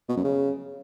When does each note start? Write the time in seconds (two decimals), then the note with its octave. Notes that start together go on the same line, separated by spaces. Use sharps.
0.09 B2
0.16 F#2
0.24 C#3